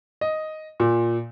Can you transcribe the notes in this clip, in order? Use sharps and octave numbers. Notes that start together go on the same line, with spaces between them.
D#5
A#2